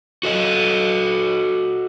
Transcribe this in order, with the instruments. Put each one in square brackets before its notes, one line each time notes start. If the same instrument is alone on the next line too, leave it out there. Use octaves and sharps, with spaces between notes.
[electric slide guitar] F#4 A4 D#5